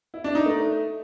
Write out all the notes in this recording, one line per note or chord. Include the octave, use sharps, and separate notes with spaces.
E4
D4
D#4
A3